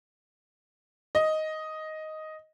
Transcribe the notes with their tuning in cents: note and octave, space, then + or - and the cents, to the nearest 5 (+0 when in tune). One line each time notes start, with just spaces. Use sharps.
D#5 +5